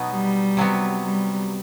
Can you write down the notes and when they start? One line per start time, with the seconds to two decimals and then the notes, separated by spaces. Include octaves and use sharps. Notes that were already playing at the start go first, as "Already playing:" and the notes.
Already playing: B2 F#3 B3 D#4
0.11 G3
0.57 C3 F#3 B3
1.05 G3